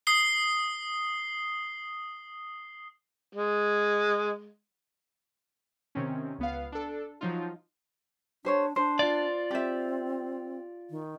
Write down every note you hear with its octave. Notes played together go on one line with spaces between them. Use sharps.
D#6 C7 G7
G#3
C3 D#3 C4 C#4
C#2 B3 F5
D4 A4
F3 F#3 D#4 F4
D4 G4 C5 C#5
D4 C5
F4 D5
C4 G4 E5
D#3